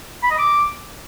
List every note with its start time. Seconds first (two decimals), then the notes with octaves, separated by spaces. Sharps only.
0.23 B5
0.31 D#5
0.38 D6